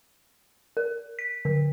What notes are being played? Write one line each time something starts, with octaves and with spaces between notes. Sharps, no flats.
A#4
B6
D3